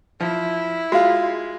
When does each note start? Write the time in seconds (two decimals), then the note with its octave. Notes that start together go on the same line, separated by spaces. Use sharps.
0.20 F3 E4
0.92 G#3 F4 F#4 F5